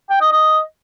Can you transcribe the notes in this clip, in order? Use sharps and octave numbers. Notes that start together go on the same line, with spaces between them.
G5
D#5
D#5